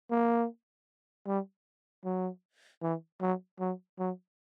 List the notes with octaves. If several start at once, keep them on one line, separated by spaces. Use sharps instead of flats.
A#3
G3
F#3
E3
F#3
F#3
F#3